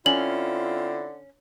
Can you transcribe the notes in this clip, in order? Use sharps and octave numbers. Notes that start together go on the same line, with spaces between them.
D3 C4 C#4 E4 F4 F#7